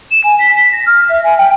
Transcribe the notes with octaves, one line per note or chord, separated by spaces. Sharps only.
E7
G#5
B6
B6
A#6
F6
E5
G#5
G5